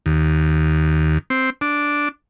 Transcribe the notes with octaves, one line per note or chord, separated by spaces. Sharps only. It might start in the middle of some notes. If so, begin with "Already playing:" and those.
D#2
C4
D4